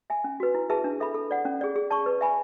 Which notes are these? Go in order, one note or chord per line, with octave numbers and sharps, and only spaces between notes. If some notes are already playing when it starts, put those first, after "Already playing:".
E5 G#5
C#4
F#4 B4
E4
G#4 B4 E5 A5
D4
A4 E5 B5
A4
D5 F#5
C#4
G#4 D5
G#4
D5 A5 C#6
B4
E5 G#5 B5